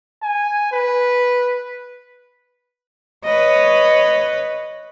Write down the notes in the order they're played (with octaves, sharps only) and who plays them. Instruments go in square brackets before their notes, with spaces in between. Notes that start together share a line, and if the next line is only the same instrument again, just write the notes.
[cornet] G#5
B4
[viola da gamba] B4 C#5 D#5